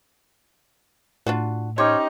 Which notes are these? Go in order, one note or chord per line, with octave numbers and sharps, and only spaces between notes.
A2 D4 F4 F#4
C#4 D#4 G4 C5 C#5